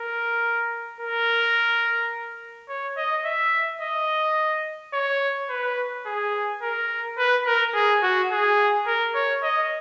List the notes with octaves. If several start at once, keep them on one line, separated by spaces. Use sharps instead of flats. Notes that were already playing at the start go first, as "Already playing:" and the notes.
Already playing: A#4
A#4
C#5
D#5
E5
D#5
C#5
B4
G#4
A#4
B4
A#4
G#4
F#4
G#4
A#4
C#5
D#5